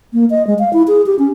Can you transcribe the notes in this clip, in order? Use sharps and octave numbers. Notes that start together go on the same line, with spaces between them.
A#3
D#5
G#3
F5
E4
G#4
G4
C#4